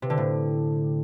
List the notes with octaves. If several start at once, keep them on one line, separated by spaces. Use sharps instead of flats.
C3
D3
A2